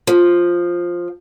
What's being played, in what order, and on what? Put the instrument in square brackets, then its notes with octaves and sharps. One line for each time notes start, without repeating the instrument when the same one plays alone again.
[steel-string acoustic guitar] F3